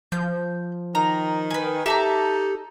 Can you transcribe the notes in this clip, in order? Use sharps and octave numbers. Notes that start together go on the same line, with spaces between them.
F3 G6
D#3 A#5
B4 G#5
D#4 G4 A4 E5 A5 A#5